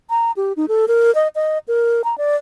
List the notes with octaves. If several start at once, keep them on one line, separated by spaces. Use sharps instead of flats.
A#5
G4
D#4
A4
A#4
D#5
D#5
A#4
A#5
D5